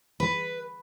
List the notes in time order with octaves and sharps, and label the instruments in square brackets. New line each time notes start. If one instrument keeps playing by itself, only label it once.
[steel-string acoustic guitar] B4